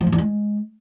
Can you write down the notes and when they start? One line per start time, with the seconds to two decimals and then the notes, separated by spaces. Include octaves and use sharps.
0.01 F3
0.07 G#2
0.12 E2
0.18 G#3